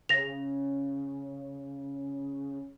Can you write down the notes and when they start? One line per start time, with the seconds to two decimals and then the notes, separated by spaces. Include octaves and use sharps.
0.09 C#3 A#6 F7